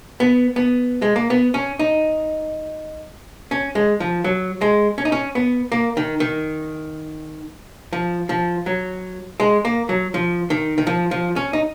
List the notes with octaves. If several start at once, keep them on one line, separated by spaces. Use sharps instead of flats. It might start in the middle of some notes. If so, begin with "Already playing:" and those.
B3
B3
G#3
A#3
B3
C#4
D#4
C#4
G#3
F3
F#3
G#3
C#4
D#4
C#4
B3
A#3
D#3
D#3
F3
F3
F#3
G#3
A#3
F#3
F3
D#3
D#3
F3
F3
C#4
D#4